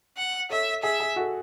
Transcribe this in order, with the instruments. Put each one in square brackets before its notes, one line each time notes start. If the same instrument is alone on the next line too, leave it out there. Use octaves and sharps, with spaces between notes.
[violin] F#5
[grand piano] A4 C#5 [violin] E5
[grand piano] G#4 [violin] E5
[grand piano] G#4
F#4 A4